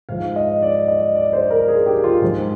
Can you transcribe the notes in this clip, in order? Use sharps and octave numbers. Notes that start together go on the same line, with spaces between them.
G#2 F3 F5
D#5
D5
D#5
D5
C5
A#4
G#4
G4
F4
G#2 F3